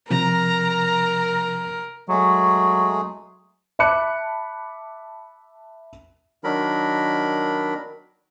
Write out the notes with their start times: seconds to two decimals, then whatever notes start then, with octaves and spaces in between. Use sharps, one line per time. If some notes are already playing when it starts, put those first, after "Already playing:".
0.10 C3 F3 A#4 A#5
2.09 F#3 G#3 A3 G#4
3.79 E5 A5 B5 D6 F#6 C#7
6.44 D#3 F#3 D4 A#4 B5